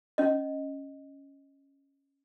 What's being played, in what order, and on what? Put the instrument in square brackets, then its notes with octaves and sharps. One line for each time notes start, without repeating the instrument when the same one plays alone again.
[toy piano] C#4 D#5